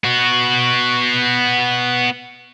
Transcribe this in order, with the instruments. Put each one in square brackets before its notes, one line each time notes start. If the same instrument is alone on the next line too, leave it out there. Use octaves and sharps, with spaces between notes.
[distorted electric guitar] B3 F#4